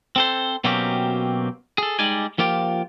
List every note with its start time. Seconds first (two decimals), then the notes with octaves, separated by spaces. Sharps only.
0.16 C4 A4 C5
0.64 B2 F#3 A#3 C4 C#4 G4
1.78 G#4 A4
1.99 G3 G#3 D#4 D5 G#5
2.38 F3 A#3 F4 G4